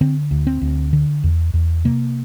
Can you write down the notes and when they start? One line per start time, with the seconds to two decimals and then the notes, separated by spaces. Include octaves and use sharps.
0.01 D3 C4
0.31 D2
0.47 C4
0.62 D2
0.93 D3
1.24 E2
1.54 E2
1.85 C3 A#3